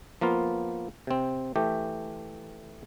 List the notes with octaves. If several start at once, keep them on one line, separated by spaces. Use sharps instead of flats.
F3 A#3 B3 F4
C3 C4
E3 A3 G4